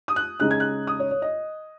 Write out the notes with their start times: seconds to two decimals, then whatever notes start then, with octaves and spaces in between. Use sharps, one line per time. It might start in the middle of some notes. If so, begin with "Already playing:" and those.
0.08 D#6
0.16 F#6
0.40 C#3 G#3 D#4 F#6
0.51 G#6
0.60 F#6
0.87 D#6
1.00 C#5
1.11 C#5
1.22 D#5